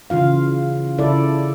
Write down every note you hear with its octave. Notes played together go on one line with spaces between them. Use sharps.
C#3 E3 F4 F5
C#3 E4 A4 D5